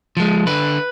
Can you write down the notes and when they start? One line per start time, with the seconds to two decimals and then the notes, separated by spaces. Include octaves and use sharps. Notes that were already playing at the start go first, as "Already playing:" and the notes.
0.17 F3 G#3
0.47 D3 B4